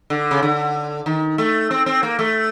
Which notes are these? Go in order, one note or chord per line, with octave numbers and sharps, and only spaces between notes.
D3
C#3
D3
D#3
A3
C4
C4
A#3
A3